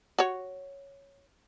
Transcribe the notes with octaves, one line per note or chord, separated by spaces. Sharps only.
F#4 C#5